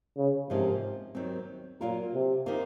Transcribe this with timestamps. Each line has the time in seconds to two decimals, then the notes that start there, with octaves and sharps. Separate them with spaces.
0.17 C#3
0.50 G#2 C3 F3 A#3 C#4
1.15 D#2 D#3 F#3 C4
1.81 A#2 F#3 A#3 F4 A#4
2.14 C3
2.46 C3 D#3 A#3 F4